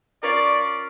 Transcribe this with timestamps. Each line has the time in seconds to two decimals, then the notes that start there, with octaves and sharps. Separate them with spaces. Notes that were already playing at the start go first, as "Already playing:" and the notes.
0.23 C#4 F4 A#4 D5